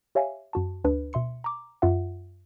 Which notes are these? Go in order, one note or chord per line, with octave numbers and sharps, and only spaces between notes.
G4 C#5 E5 F5 G#5
F#2 F#4 A5
D2 D4 B4
B2 E5 C6 C#7
A#5 D6
F#2 F4 E5 F#5